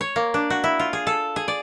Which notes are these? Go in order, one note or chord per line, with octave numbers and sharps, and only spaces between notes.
C#5
A#3
D4
F#4
E4
F4
G#4
A4
G#4
D5